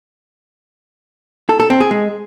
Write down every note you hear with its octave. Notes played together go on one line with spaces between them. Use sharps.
A4
A4
C4
G#4
G#3